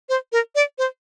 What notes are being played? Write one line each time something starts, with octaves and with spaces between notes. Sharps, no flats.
C5
A#4
D5
C5